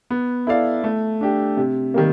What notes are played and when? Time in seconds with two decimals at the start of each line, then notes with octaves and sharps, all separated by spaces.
0.10 B3
0.47 E4 A4 D5 F5
0.84 A3
1.21 D4 G4
1.57 C3
1.94 D#3 G3 A#3